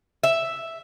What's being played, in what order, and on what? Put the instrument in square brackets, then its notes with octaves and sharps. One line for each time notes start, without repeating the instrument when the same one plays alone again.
[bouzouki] E5